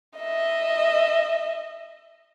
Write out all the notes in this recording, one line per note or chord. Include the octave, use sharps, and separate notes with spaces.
D#5 E5